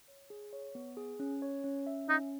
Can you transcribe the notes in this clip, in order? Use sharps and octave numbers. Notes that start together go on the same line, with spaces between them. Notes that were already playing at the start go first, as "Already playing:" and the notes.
C#5
G#4
C#5
B3
G#4
C#4
C#5
C#4
E5
C#4 D#4